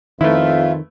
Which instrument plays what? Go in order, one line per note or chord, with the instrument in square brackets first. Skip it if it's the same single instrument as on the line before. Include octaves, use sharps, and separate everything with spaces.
[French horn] F2 [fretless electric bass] D#3 [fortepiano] A3 B3 E4 [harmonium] F4 E5 F5